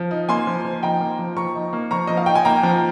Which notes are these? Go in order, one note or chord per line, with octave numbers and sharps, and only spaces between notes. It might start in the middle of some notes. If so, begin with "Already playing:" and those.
Already playing: F3
D#4
A#3 G#5 C6
F3
F3
D#4 G5 A#5
A#3
F3
F3 A#5 C#6
D#4
A#3
F3 A#5 C#6
F3 D#5
F5
D#4 G5
G#5
A#3 G5 A#5
F3